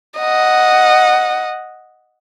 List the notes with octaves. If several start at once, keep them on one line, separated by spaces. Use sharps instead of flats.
D#5 F#5